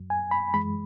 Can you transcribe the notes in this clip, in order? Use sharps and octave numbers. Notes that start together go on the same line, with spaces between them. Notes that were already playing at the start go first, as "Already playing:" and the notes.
Already playing: F#2 F#3
G#5
B5
F#2 E3 G#3 B5